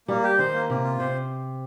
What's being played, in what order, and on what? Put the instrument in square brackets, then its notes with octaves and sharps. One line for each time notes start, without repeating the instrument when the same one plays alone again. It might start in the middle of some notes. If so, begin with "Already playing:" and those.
[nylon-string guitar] G3 [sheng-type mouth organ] A#3
[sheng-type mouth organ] G4
[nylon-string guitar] D#3 [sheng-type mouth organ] C5
[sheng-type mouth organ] A#3
[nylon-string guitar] C3 [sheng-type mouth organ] A#3
[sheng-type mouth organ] F4
[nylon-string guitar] C3 [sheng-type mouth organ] C5